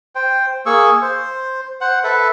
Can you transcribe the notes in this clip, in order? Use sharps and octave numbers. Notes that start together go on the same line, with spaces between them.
C5 G5
A#3 G#4 C#6 E6
C5
C5 F#5
A4 B4 E5